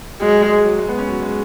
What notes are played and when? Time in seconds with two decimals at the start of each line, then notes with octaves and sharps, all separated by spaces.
0.21 F#3 G#3
0.49 G#3
0.65 F#3
0.79 G#3
0.89 B3
0.98 C#4
1.08 F#3
1.22 G#3